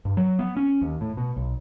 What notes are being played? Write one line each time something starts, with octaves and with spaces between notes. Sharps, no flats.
G2
F#3
B3
C#4
D#2
A2
B2
B1